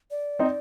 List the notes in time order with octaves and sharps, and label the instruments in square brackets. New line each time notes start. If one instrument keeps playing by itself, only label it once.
[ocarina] D5
[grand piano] C4 D#4